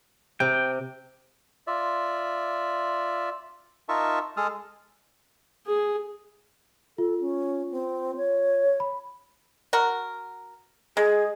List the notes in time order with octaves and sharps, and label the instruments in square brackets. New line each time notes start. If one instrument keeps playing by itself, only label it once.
[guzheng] C3 [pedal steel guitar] G5
[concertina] F4 D5 E5
D#4 F4 A#4 E5 A5 C#6
G#3 G#4 A4 A5 D#6 F6
[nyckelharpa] G#4
[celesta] F4 [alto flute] A4
[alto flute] C#4
C4
C#5
[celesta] B5
[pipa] F#4 A#4
[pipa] G#3 [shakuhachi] G#4